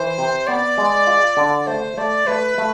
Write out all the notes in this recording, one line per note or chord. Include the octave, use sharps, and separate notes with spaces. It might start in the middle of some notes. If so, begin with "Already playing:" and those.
Already playing: E3 C5
C3
B3 D5
G#3
F4
D3
A3 C5
A3 D5
A3 B4
A3